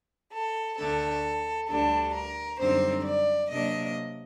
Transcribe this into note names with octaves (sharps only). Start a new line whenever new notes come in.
A4
D2 D3 A3 A4
D2 D3 G3 D4 A4
A#4
F#2 D3 G3 C4 D#4 C5
D5
C3 F#3 A#3 D4 D#5